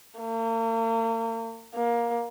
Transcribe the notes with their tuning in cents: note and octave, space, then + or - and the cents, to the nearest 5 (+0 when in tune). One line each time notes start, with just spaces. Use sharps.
A#3 -40
A#3 +15